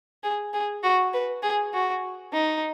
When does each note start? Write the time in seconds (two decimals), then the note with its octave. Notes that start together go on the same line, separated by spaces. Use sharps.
0.23 G#4
0.53 G#4
0.83 F#4
1.13 B4
1.42 G#4
1.74 F#4
2.33 D#4